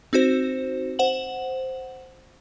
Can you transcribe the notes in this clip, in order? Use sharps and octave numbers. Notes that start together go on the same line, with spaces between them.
C4 D#4 F#4 C5
C5 F#5 F#7